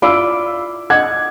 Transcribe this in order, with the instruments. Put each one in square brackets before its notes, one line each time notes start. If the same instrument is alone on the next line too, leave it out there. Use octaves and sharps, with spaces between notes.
[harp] E4 F4 D5 [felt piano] B5 E6
[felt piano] D#5 D6 G#6 [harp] F#5